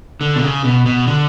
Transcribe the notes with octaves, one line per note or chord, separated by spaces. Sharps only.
D3
B2
C#3
B2
B2
D3